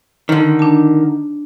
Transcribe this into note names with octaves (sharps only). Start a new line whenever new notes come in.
D3 D#3
D4 A5